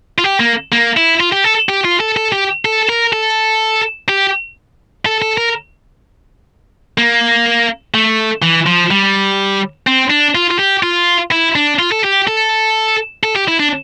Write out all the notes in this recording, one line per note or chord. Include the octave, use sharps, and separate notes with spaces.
F4
G4
A#3
A#3
E4
F4
G4
A4
G4
F4
A4
A4
G4
A4
A#4
A4
G4
A4
A4
A#4
A#3
A3
E3
F3
G3
C4
D4
F4
F4
G4
F4
E4
D4
F4
A4
G4
A4
A4
G4
E4
D4